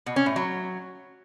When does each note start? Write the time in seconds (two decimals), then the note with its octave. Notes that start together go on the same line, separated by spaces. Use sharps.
0.06 B2
0.16 C#4
0.26 A2
0.36 F#3